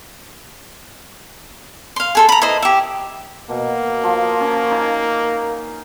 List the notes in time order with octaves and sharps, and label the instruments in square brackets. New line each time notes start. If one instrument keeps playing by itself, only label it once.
[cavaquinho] F5 C6
G#4 A4 C6
A#5 B5
E4 B4 C5 D#5
G4 E5
[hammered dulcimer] B2 [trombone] A#3
[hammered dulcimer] F3
C#4
D#4